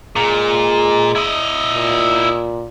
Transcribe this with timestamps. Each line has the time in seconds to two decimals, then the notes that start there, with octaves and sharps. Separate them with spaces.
0.16 A#2 G#3
1.16 E4 D#5
1.73 A#2